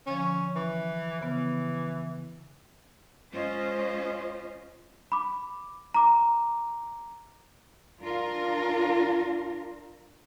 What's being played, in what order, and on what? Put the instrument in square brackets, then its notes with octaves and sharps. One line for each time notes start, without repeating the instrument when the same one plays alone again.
[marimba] D3 F3 [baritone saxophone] C#4
[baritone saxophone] E3
[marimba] C#3 B3 [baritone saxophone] E3
[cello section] G#3 C#4 F4 C5 D#5
[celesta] B5 D6
A#5 D6
[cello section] D4 F4 A#4